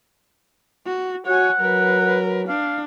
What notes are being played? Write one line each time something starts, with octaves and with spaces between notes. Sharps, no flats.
F#4
F#4 C#5 F#5 G#5
F#3 A#4 B4
D4 F5